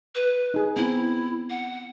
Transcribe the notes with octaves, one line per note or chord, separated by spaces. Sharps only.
B4
D#4 G#4
B3 C4 E4
F#5